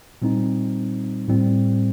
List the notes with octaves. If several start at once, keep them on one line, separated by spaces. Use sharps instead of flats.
A#2 G3 C4 D#4
A2 G3 C4